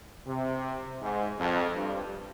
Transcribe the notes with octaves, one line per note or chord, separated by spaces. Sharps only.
C3
G#2
F2
G2